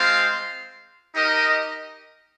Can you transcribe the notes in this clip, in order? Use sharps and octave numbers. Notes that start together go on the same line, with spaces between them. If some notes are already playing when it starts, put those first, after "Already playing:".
Already playing: G#3 C4 F4 C5 F5
D#4 G4 A#4 D#5